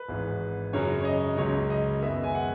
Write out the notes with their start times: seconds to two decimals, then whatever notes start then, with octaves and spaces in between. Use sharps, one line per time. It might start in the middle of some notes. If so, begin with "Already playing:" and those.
Already playing: B4
0.08 G#1 G#2 E3
0.73 F#2 C#3 F#3 C#4 C#5
1.01 C#5
1.05 D#5
1.37 C#2 C#3 F#3 C#5
1.70 D#5
2.02 F#2 D#3 G#3 B3 E5
2.23 G#5
2.35 F#5